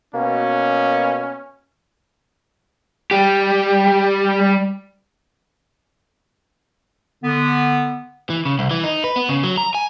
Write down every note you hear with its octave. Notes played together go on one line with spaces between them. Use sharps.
B2 A#3 C#4
G3 G4
D3 B3
E3
C#3
C2
E3
D#4
B4
B3
C#3
F#3
A#5
G#5